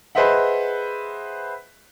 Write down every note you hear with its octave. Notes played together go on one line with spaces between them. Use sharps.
G#4 B4 C5 D#5 E5 F#5